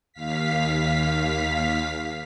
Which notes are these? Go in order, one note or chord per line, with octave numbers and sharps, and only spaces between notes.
D#2 F5 B6